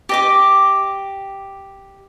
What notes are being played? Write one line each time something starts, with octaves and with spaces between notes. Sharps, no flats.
G4 D#5 D6